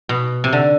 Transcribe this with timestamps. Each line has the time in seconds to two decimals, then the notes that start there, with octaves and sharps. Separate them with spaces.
0.09 B2
0.44 C3
0.53 D3